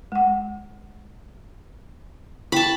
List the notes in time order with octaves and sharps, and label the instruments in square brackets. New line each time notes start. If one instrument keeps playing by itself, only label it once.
[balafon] G#3 F#5
[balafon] E4 G5 [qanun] A5 B5